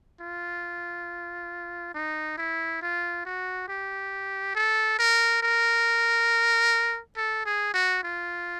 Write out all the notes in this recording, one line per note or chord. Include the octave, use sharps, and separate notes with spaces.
F4
D#4
E4
F4
F#4
G4
A4
A#4
A#4
A4
G#4
F#4
F4